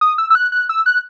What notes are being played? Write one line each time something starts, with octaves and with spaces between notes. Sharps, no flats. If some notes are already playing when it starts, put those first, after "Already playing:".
D#6
E6
E6
F#6
F#6
E6
F#6